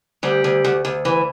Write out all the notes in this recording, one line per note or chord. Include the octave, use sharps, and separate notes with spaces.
D2 G3
D2
D2
D2
E3